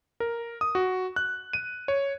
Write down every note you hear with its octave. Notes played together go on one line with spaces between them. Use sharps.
A#4
D#6
F#4
F#6
D#7
C#5